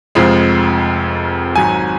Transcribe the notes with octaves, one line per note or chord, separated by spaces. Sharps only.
F1 F2 F3 G#3
G#1 G#2 F#3 G#5